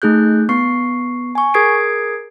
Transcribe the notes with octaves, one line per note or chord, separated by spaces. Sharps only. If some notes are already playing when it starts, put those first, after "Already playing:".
A3 D#4 G#4 F#6 G6
B3 C#6 C7
G#5 C#6
G#4 A#4 D#6 G#6 C7 D7